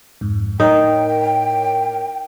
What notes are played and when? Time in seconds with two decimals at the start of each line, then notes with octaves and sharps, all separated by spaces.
0.21 F2 G#2
0.60 A2 D#4 A#4 C#5 G5